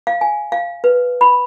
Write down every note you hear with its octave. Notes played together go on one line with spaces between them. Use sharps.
F5
G#5
F5
B4
B5